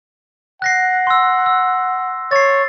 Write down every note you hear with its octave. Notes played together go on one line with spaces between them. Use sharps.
F#5 F#6 A#6 C7
C6 E6
E6
C#5 A6 C7